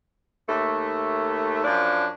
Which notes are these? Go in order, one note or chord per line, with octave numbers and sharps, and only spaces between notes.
D#2 A3
F#2 F3 D4